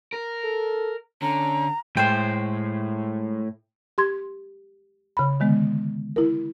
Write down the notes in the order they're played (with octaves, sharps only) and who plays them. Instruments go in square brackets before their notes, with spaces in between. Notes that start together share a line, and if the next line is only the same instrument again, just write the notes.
[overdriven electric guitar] A#4
[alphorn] A4
[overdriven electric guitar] D3 [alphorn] C#4 [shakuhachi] A#5
[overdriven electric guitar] A2 [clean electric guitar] G#3 C5 [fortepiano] G5
[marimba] G4 C6 G#6
C#3 B5
D3 D#3 G#3 B3
E4 A#4